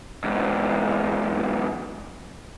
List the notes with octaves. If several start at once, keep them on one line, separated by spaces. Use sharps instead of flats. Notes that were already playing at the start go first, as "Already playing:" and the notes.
E2 G#2